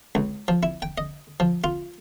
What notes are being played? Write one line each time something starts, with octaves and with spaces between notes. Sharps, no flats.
C#2
F3
E4
G5
D#5
F3
F4